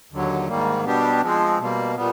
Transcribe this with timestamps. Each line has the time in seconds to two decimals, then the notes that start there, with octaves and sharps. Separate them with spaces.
0.11 D#2 D3 F#3
0.48 G#2 D#3 G3 A#3
0.85 B2 G3 B3 D4 G4
1.22 F3 G#3 C4
1.59 B2 G3 A#3
1.96 A#2 G3 B3